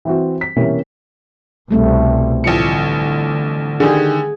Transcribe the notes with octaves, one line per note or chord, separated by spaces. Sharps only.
E3 C4 F#4
B6
C3 E3 A#3 B3 C#4
C2 B2 G3 A3 C4
A1 D3 F3 C#7
D3 D#3 G4 G#4